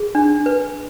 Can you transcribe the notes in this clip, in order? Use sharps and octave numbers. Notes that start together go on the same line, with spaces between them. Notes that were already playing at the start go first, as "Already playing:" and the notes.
Already playing: G#4
D4
B4